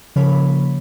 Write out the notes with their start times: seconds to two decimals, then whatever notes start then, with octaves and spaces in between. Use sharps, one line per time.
0.16 C#3 F3 A#3 C#5 B5